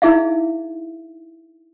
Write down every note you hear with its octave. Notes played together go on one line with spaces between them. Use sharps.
D#4 E4 G#4 E5 F5